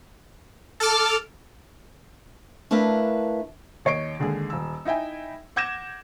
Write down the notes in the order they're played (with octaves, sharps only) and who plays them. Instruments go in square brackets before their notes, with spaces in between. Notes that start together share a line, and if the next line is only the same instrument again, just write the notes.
[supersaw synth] A4 [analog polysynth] D6 F6 A6
[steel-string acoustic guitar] A3 D4 E4 A#4 B4 F5
[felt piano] D#2 C#5 D#5 C7 D7
D#2 D3 G#3 G#4
D#1 E6
D#4 E4 E5 G5 G#5
F#5 D6 G6 G#6 A#6 E7